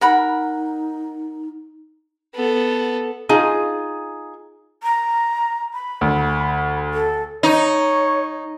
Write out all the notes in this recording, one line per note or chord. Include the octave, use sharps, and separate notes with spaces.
D#4 A#4 F#5 B5
B3 A4
D#4 F4 G#4
A#5
B5
D2
A4
D#4 C#5